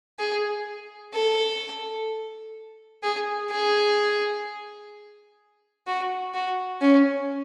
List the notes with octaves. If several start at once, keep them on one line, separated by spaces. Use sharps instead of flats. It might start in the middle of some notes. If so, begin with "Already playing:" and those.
G#4
A4
G#4
G#4
F#4
F#4
C#4